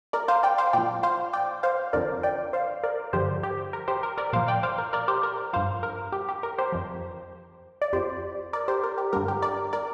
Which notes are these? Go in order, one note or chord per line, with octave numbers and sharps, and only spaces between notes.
A#4 D5
C5 F5
D5 G5
C5 F5
A#2 F3 D5 G5
C5 F5
D5 G5
C5 F5
F2 D3 F3 A#4 D5
D5 G5
C5 F5
A#4 D5
G2 D3 F3 G4 C5
G4
A#4
G4 C5
A#4
A#4 D5
A#2 F3 C5 F5
D5 G5
C5 F5
A#4
A#4 D5
G4 C5
A#4
G2 F3 C5 F5
A#4
G4
G4
A#4
G4 C5
F2 F3
D5
F2 F3 G4 C5
A#4 D5
G4 C5
A#4
G4
G2 D3 G3 A#4
G4
A#4 D5
A#4 D5